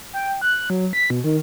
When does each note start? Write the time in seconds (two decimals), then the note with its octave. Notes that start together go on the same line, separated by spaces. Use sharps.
0.13 G5
0.41 F#6
0.70 F#3
0.93 B6
1.10 B2
1.24 D#3